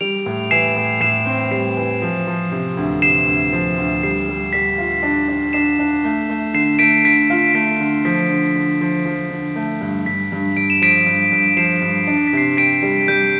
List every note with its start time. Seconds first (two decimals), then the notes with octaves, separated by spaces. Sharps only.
0.01 G3 D7 F7
0.26 A2
0.51 E3 C7 E7
0.76 A2
1.00 A2 C7 E7
1.26 C4
1.51 G3 C7
1.77 E3
2.02 F3
2.27 F3
2.52 C3
2.77 D2
3.02 C3 C7 E7
3.27 D2
3.52 F3
3.78 D2
4.03 G3 C7
4.28 G3
4.53 G3 B6
4.78 F4
5.03 D4
5.28 D4
5.53 D4 C7 E7
5.79 D4
6.04 A3
6.30 A3
6.54 D3 C7 E7
6.79 A3 B6 D7
7.05 D3 B6 D7
7.30 F4
7.54 A3 B6
7.80 D3
8.05 F3 B6
8.30 D3
8.56 D3
8.81 F3
9.05 F3
9.31 D3
9.55 A3
9.81 G2
10.06 G2 B6
10.32 G2
10.56 G2 D7
10.70 E7
10.82 F3 B6 D7
11.07 G2
11.32 G2
11.56 F3 C7 E7
11.82 G2
12.07 D4 D7
12.18 C7
12.27 B6
12.33 C3 C7
12.57 G4 B6 D7
12.83 G3
13.08 G3 G6